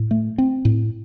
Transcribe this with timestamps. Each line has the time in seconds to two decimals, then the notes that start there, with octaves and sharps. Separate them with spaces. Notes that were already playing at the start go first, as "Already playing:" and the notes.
Already playing: A2
0.11 A3
0.38 C4
0.65 A2